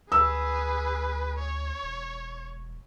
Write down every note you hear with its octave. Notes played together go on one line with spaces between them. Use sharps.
D2 G#4 B4 E6
C#5
E1